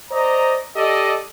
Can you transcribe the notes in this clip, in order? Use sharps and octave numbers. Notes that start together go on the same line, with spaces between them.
C5 D5 D#5 A#5
G4 A4 D5 D#5